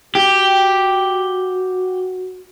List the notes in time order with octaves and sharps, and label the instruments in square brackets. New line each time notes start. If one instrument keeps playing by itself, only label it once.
[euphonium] F#4 [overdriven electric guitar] G4